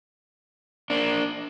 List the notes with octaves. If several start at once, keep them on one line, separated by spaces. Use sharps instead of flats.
A#3 D4